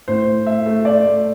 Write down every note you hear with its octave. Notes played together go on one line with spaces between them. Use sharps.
A2 C5
A2
A3 E5
A3
A2 D5
A3